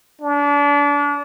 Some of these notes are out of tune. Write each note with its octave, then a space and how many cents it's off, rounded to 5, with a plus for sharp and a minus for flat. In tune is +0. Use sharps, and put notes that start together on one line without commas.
D4 -30